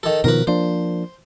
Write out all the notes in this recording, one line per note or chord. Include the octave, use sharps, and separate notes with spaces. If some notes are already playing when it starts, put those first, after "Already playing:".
D#3 A4
B2 D#3 F3 A#4 B4
F3 A#3 D4 C5